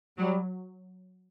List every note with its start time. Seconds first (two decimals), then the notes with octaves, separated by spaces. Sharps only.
0.18 F#3 G3